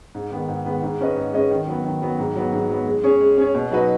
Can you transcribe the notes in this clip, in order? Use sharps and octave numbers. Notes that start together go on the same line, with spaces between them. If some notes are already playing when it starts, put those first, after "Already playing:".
G#2
D#3 G#3 B3
G#2
D#3 G#3 B3
G#2
G#3 C#4 B4 D#5
G#2
G#3 C#4 B4 D#5
D#3
F#3 B3
D#3
F#3 B3
G#2
F#3 B3
G#2
F#3 B3
G#3
C#4 G#4 C#5
G#3
C#4 G#4 C#5
B2
F#3 D#4 F#4 B4